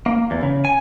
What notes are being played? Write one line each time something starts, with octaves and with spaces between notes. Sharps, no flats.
A#3
E2
C#3
G#5